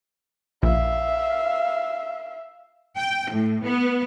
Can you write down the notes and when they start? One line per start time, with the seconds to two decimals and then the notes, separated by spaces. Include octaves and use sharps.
0.63 A#1 E5 F5
2.97 G5
3.32 A2
3.64 B3